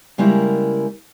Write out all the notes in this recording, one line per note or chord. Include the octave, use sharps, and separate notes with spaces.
C#3 G3 G#3 A#3 E4 A#4